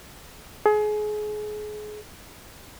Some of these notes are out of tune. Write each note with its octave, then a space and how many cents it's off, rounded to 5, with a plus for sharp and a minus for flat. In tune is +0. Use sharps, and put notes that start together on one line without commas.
G#4 +30